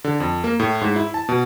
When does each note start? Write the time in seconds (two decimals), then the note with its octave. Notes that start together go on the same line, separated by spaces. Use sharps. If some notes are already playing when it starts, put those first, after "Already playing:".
0.04 D3
0.20 F2
0.44 A#3
0.60 A2
0.81 G#2
0.96 E4
1.14 A5
1.29 B2